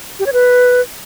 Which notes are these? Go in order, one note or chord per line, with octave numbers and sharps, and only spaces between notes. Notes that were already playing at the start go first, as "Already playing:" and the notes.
G4
C#5
B4